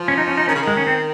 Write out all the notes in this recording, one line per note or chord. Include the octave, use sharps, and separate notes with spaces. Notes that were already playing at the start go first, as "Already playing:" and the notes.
Already playing: F3
C#4
D#4
C#4
D#4
D#3 C#4
C#3
D#3
G#3
C#4
C4